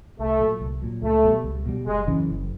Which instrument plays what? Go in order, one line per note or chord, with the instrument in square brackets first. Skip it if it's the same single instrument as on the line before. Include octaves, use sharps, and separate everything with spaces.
[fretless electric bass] C2 [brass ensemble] A3
[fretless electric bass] A#2 F#3
C2
A#2 F#3
[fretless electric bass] C#2 [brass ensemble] A3
[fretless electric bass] B2 G3
C#2
B2 G3
[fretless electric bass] F#1 [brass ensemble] G#3
[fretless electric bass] F#2 C#3 E3
F#1